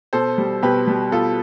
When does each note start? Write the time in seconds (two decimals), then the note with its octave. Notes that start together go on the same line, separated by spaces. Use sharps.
0.13 B2 A4 C5
0.38 G3
0.62 B2 G4 B4
0.87 G3
1.12 B2 F4 A4